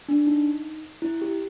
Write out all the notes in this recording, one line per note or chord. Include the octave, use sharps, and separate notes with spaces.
D4
D#4
E4
G4